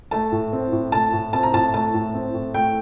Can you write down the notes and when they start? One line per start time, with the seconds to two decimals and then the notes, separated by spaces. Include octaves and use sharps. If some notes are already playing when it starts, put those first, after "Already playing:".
0.11 A3 A5
0.32 A2
0.53 C4
0.72 A2
0.92 A3 A5
1.13 A2
1.33 C4 A5
1.43 A#5
1.53 A2 A5
1.74 A3 A5
1.94 A2
2.14 C4
2.34 A2
2.54 A3 G5